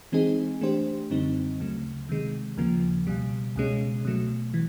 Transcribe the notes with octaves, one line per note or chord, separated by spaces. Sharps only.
E3 G#3 C4 D#4 G#4
E3 A3 D4 G4 C5
F#2 D3 G3 C4 D#4
D2 C#3 F#3 A3
C3 D#3 G#3
D#2 C#3 F3 A#3
C#2 B2 G3
C#2 B2 G#3 C#4
B2 F#3 A3
E3